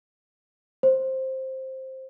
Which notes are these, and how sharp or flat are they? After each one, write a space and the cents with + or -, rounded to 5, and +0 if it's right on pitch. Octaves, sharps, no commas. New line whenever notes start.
C5 +10